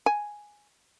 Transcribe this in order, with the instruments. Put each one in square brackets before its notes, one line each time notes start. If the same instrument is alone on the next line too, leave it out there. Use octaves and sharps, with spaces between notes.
[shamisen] G#5